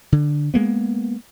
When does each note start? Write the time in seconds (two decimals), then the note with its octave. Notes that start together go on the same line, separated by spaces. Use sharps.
0.12 D3
0.54 G#3 A#3 B3